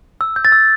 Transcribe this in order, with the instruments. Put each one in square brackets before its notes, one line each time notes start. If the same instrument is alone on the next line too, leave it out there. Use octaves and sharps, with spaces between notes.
[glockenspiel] E6
G6
A6
E6